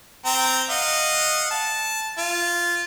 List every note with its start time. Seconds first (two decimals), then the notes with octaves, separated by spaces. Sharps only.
0.26 C4 G5 A#5
0.70 D#5 F5 F#5
1.51 A5
2.18 F4